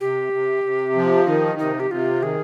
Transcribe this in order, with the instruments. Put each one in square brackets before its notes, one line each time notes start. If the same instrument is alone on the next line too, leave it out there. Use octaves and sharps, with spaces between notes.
[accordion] C3 [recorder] G4
[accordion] C3
C3
F3
[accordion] D#3 [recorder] D#4
[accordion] C3 [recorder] D#4
[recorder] G4
[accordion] C3 [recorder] F4
[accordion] D#3 [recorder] G#4